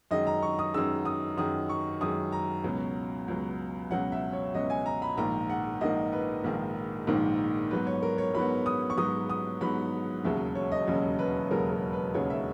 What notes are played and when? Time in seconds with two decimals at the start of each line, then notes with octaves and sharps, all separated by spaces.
0.11 F#2 D#3 G#3 D#5
0.27 A#5
0.42 C#6
0.59 D#6
0.74 F#2 D#3 G#3 E6
1.05 D#6
1.37 F#2 D#3 G#3 D#6
1.69 C#6
2.01 F#2 D#3 G#3 D#6
2.32 A#5
2.64 C#2 B2 F#3 C#4
3.28 C#2 B2 F#3 C#4
3.91 C#2 B2 F#3 C#4 F#5
4.12 E5
4.33 C#5
4.54 C#2 B2 F#3 C#4 D#5
4.70 G#5
4.86 A#5
5.02 B5
5.17 A#1 G#2 D#3 A#3 A#5
5.50 F#5
5.81 A#1 G#2 D#3 A#3 D#5
6.12 B4
6.44 A#1 G#2 D#3 A#3
7.07 A#1 G#2 D#3 A#3
7.71 G#2 F#3 B3 B4
7.87 C#5
8.03 A#4
8.18 C#5
8.34 G#2 F#3 B3 B5
8.66 D#6
8.90 C#6
8.98 G#2 F#3 B3 D#6
9.30 D#6
9.61 G#2 F#3 B3 B5
10.24 E1 D#2 C#3 F#3 C#4 E5
10.55 C#5
10.72 D#5
10.87 E1 D#2 C#3 F#3 C#4 C#5
11.19 B4
11.51 E1 D#2 C#3 F#3 C#4 A#4
11.72 A#4
11.93 B4
12.14 E1 D#2 C#3 F#3 C#4 C#5
12.30 E5